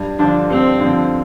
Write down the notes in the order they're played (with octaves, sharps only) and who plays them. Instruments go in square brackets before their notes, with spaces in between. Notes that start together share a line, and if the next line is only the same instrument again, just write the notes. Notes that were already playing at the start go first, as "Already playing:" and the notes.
Already playing: [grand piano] G2
[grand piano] D3 F3 [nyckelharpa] D4
[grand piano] G2 [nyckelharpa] C4
[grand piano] D3 F3